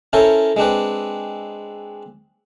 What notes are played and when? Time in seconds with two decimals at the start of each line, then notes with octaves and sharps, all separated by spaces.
0.13 C#4 E4 A4 A#4 C5 C#5
0.56 G#3 C4 D4 B4